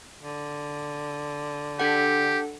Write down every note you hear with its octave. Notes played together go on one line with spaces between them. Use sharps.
D3
D4 G4 A4 F#5